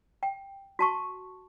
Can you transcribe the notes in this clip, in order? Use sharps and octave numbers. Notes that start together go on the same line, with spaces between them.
G5
F#4 A5 C#6